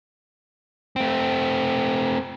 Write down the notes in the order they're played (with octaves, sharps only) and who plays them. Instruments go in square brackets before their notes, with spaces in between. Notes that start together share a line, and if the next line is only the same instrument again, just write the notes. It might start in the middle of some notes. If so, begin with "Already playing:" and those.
[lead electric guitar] A3 C4